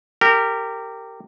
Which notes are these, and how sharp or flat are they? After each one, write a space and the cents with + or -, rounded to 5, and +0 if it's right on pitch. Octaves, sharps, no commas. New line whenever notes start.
G4 +0 A#4 -25